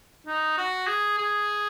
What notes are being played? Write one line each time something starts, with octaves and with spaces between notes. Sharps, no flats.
D#4
F#4
G#4
G#4